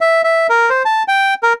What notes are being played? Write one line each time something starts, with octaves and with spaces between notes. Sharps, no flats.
E5
E5
A#4
C5
A5
G5
A#4